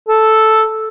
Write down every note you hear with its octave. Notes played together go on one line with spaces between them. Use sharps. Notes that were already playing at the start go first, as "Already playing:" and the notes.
A4